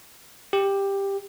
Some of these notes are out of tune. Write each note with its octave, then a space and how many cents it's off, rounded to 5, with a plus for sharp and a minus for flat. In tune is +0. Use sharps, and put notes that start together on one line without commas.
G4 +10